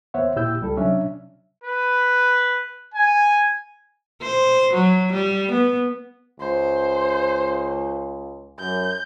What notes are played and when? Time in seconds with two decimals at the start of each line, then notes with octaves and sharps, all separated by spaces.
0.14 D#2 B3 C5 C#5 E5 F#5
0.36 A#2 E4 G4 E6 G6
0.61 C#2 G3 A4
0.77 C3 F#3 C#4 D4 E5
1.64 B4
2.94 G#5
4.22 C5
4.73 F#3
5.13 G3
5.52 B3
6.40 C#2 C5
8.59 F#2 G6